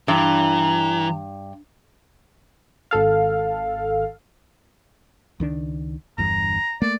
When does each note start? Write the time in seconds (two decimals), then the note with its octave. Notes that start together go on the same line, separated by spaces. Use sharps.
0.08 G2 E3 A#5
2.91 G#1 A4 F5
5.40 C#2 D#3 D4
6.18 G1 E2 G2 A#5
6.82 A3 A#3 D5